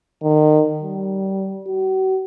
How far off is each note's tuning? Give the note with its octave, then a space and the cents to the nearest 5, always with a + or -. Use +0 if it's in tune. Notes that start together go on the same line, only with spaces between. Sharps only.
D#3 -30
G3 -25
F#4 +40